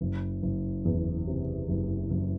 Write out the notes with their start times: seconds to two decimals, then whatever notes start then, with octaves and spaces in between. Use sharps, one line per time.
0.01 F#1
0.43 F#1
0.85 E2
1.27 C3
1.68 F#1
2.11 F#1